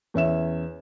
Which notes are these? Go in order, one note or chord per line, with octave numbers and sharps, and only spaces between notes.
E2 C#4 E5 E7